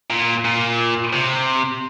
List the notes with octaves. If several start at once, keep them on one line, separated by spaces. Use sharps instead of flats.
A#2
A#2
C3